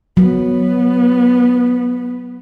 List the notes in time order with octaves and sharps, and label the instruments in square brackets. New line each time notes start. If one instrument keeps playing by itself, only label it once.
[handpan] F#3 [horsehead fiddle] B3